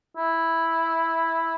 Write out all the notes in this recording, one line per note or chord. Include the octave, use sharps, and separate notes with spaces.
E4